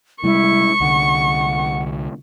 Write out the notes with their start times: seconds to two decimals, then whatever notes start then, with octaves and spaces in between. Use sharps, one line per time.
0.23 C3 G3 G#3 E4 C#6
0.80 C2 D3 F#5